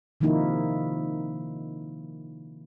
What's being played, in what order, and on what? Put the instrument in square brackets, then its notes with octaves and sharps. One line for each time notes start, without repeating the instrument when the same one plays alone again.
[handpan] C3 D#3 F3 A#3 D#4 E4